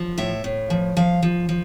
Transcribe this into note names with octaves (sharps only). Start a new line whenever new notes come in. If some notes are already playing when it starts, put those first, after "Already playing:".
Already playing: F3
A2 E5
A2
F3
F3 F5
F3
F3